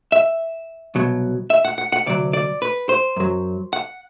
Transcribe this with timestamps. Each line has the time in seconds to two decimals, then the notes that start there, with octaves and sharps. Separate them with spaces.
0.12 E5
0.95 C2 B2 F#3
1.50 E5
1.65 F#5
1.78 F#5
1.92 F#5
2.06 D2 C3 F#3 D5
2.33 D5
2.62 B4
2.89 C5
3.16 F#2 F#3
3.73 F#5